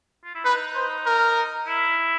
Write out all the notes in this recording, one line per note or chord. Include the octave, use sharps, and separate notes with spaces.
F4
E4
D#4 B4
C5
A#4
E4